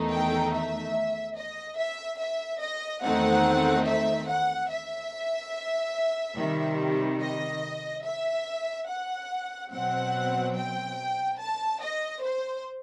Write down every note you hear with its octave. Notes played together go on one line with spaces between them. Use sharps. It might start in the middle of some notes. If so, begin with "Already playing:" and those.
Already playing: E2 D#3 A3 D#4
G5
E5
D#5
E5
E5
D#5
E2 D#3 A3 C4 D#4 F#5
E5
F#5
E5
C3 D#3 G3
D#5
E5
F#5
B2 F#3 C4 F#5
G5
A5
D#5
C5